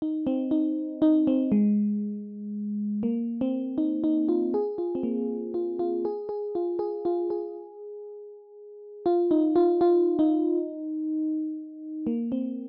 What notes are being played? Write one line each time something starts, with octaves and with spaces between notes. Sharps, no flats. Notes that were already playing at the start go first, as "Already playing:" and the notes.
D#4
C4
D#4
D#4
C4
G#3
A#3
C4
D#4
D#4
F4
G#4
F4
C4
A#3
F4
F4
G#4
G#4
F4
G#4
F4
G#4
F4
D#4
F4
F4
D#4
A#3
C4